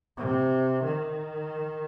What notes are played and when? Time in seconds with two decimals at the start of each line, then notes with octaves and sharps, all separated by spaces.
0.17 C3
0.83 D#3